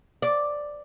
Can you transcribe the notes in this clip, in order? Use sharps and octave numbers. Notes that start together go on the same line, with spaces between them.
D5